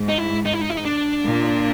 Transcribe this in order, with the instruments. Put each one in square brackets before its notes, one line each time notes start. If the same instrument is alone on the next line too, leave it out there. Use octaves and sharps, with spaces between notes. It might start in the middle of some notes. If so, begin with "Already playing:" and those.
Already playing: [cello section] G#2
[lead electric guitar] D#4
E4
D#4
E4
D#4
E4
D#4
D4
[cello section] A#2